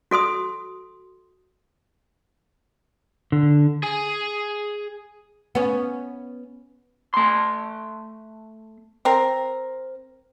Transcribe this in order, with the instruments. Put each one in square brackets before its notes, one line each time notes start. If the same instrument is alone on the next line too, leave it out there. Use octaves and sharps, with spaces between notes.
[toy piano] F#4 A4 C6 D#6
[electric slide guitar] D3
[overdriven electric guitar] G#4 G#5
[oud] B3 C#4
[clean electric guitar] A3 C6
[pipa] C4 A#4